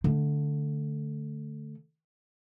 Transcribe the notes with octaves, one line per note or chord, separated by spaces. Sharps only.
D3 A3